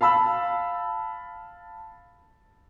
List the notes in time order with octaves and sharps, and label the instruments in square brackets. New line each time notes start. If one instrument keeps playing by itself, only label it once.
[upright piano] F5 A5 B5 E6